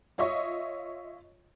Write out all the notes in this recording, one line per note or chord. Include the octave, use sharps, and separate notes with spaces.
F4 C#5 D#5 E5 C#6